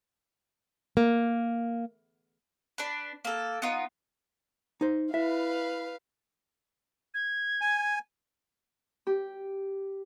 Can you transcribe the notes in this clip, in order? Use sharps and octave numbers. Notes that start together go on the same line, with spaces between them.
A#3
D4 B4
A#3 A4
B3 D#4 F4
D#4 C5
E4 B4 E5 F5
G#6
G#5
G4